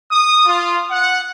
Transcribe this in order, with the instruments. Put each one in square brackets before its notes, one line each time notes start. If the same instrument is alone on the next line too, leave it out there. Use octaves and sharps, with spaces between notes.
[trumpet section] D#6
F4
F#5